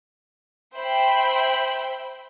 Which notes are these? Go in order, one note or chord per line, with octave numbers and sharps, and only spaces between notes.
C5 E5 G5 B5